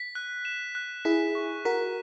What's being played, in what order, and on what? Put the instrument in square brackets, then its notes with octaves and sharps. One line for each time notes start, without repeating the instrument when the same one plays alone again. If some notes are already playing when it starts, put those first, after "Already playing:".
Already playing: [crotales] B6
F#6
E7
F#6
[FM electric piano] E4 G#4 [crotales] B6
[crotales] C#6
[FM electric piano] F#4 A#4 [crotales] B6